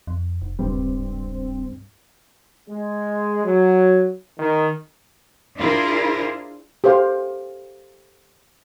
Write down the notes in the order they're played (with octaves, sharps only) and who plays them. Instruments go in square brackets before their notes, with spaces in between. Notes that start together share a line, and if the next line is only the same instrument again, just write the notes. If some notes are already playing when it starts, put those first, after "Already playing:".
[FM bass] F2
F1
[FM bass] D#1 [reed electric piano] C#2 G2 G3 [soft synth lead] C4
[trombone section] G#3
F#3
D#3
[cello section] D4 E4 F4 G#4 A#4 C5
[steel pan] G4 A4 C5 F5